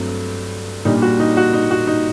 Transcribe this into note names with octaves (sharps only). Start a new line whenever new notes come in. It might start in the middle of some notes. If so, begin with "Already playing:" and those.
Already playing: G2 F#3 A3 C4
A#2 G3 D4 D#4
F#4
D#4
F#4
D#4
F#4
D#4